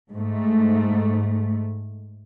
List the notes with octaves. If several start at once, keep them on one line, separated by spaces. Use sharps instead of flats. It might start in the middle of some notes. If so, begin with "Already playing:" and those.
G#2 A3